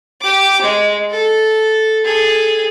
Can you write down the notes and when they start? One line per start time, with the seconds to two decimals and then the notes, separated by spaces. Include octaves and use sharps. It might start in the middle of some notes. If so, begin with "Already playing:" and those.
0.22 G4 D6
0.62 G#3
1.10 A4
2.04 G#4 A4